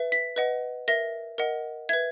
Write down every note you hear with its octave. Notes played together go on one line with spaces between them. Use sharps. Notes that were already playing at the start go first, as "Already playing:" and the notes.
Already playing: B4 E5
B6
B4 D#5 F#5
A#4 E5 A#6
A#4 D#5 F#5
B4 E5 G#6